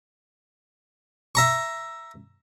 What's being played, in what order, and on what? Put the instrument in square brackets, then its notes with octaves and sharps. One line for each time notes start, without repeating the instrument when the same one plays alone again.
[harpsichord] E5 A#5 C#6